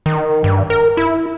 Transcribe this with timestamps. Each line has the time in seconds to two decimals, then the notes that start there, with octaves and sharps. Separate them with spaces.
0.06 D#3
0.44 G2
0.70 A#4
0.97 E4